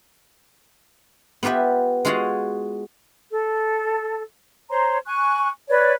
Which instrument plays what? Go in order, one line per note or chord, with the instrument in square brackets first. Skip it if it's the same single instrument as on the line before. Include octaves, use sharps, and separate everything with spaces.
[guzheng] B3 F4 G4 B4 E5
G#3 F4 F#4 G#4 F5 F#5
[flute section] A4
C5 C#5 A#5 C6
G#5 C#6 F#6
B4 C#5 D5